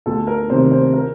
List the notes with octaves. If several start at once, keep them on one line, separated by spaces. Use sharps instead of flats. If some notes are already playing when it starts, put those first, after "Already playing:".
D2 A4
A#4
C3 D#3 C5
C5
A#4